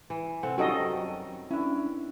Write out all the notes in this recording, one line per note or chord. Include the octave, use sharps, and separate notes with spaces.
E3
C3 C4 A4 F#5
D#3 F#3 G3 C#4 F4 F#4 A4 D#5
F#2
C#4 D4 E4